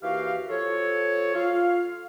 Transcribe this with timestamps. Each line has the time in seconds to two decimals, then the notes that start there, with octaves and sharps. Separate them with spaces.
0.02 D#2 E3 F#4 G4 F5
0.49 F3 A4 C#5
1.35 F4 F5